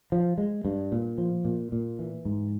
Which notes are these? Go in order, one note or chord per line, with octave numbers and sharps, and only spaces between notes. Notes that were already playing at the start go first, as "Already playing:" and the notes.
F3
G#3
G2
A#2
F3
A#2
A#2
E3
G#2